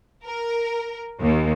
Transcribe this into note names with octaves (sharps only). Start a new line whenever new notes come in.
A#4
D#2